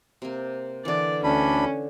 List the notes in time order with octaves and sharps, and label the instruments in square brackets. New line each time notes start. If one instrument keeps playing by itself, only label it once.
[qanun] C3 A#3
[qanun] D3 E3 [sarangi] D5
[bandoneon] D2 D4 B5 [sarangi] C#4